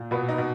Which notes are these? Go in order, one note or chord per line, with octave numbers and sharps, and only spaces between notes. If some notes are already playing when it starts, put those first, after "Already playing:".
Already playing: A#2
B2 B3 B4
D#4 D#5
B2